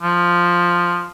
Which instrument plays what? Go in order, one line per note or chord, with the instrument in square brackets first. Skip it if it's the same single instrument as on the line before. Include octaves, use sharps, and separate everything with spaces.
[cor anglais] F3